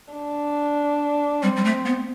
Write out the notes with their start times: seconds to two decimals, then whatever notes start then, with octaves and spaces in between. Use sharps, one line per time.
0.13 D4
1.43 G3 C4
1.56 G3
1.65 A3
1.86 B3